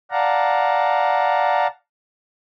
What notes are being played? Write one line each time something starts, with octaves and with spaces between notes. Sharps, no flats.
D5 F5 F#5 A5 A#5